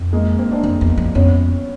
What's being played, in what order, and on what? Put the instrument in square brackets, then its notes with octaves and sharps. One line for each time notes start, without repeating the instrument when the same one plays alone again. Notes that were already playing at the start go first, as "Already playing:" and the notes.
Already playing: [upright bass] F2
[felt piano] G#3 A#3
A#3 C4
C4 D4
[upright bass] F2
E2
F2
[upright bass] F2 [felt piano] B3 C#4